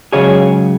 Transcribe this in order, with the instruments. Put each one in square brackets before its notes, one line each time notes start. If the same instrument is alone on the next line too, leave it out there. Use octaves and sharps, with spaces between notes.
[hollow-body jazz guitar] C#2 C#3 F#3 G#4 C#5